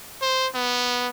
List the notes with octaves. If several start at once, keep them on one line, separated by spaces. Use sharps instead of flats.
C5
B3